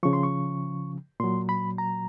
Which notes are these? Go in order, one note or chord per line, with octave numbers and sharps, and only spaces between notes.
C#3 F3 C#6
C6
C#6
A#2 F#3 C6
B5
A#5